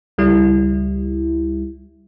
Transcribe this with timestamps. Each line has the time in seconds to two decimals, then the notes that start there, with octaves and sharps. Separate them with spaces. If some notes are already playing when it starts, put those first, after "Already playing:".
0.18 C#2 G3 E4